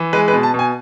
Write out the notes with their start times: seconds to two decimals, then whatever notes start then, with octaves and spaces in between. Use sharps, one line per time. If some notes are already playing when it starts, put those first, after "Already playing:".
Already playing: E3
0.13 G#3 B4
0.28 B4
0.33 B2
0.43 A5
0.54 B2
0.59 G#5